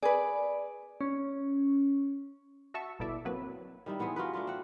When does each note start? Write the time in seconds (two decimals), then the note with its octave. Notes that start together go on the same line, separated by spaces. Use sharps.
0.03 G#4 B4 D5
1.01 C#4
2.74 F#4 E5 A5 C#6 E6
2.99 G1 B2 E4 A4 D5 E5
3.25 F#3 A#3 C4 B4
3.86 D#3 G3 D#4 E4
3.99 E3 B3 G#4 C5
4.16 F4 F#4 A#4 B4
4.33 A3 D4 F4 A#4
4.47 C4 F#5